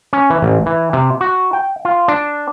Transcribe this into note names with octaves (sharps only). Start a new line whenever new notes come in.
C#4
E3
A1
E3
C3
F#4
G5
F4
D4